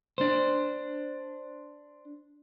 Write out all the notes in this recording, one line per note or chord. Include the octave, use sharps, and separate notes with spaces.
D4 C5